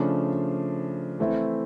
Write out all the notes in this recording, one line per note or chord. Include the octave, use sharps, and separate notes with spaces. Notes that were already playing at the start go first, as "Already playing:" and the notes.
Already playing: C#3 F3 A3 D4
E3 A3 C4 E4